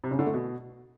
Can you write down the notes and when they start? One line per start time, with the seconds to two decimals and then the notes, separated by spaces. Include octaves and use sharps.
0.04 C3
0.11 C#3
0.19 D3
0.26 A3
0.34 B2